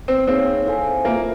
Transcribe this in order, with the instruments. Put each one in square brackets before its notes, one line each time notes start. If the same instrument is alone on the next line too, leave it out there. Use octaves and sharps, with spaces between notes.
[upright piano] C4
[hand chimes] A#3 D#4 G#4 C#5 F5 [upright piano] C4
[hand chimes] E4 A4 C5 F5 G#5
[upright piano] A#3 [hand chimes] F4 A4 C5 E5